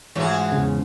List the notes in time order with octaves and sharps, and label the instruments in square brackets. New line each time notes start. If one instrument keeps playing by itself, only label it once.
[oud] G#2 F3 C#4 [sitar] E3 F#4 G#4
[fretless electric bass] E2 C#3